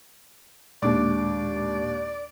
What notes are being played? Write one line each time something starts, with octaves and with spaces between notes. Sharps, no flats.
D#2 A#2 G#3 D4 D5 D6